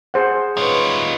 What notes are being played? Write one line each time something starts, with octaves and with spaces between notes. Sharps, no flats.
G#4 C5 F#5
D#4 F4 B4 C#5